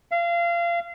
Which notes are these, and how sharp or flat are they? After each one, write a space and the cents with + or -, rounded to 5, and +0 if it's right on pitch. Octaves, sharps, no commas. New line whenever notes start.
F5 -30